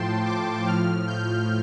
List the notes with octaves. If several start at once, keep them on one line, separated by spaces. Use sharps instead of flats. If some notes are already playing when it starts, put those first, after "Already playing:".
Already playing: A2 F3 G5 A5 C6
D6
A2 F3 F6
G6